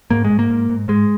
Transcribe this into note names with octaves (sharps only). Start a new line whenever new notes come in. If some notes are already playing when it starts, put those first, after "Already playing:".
G#2 A#3
G#3
G#2
A#3
G#2
G#2
G#2 G#3